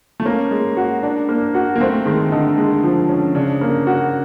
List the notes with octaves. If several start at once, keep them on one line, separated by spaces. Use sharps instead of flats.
A3
A#3 C#4
G#3
F#4
D4
A#3
F#4
A#3
A3 C4
D#3 G#3
D3 D#4
G#3
F3
C#4
C#3 D4
A#3
F#4